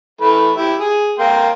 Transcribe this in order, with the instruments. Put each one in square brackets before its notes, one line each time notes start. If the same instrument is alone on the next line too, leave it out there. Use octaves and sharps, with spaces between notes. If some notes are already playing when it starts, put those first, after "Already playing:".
[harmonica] E3 A3 B5
E4 G4
G#4
A#3 G5 C6